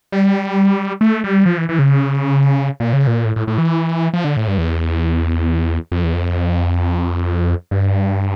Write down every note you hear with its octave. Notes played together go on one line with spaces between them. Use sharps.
G3
A3
G3
F3
E3
E3
C#3
A#2
C#3
A#2
A2
A2
A2
E3
F3
D3
A2
G2
E2
F2
E2
F2
G2